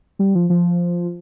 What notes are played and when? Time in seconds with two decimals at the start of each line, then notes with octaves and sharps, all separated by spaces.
0.19 G3
0.35 F3
0.50 F3